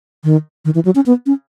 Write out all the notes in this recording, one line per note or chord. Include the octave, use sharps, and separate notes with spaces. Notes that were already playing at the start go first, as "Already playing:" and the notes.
D#3
D#3
E3
F#3
C#4
B3
C#4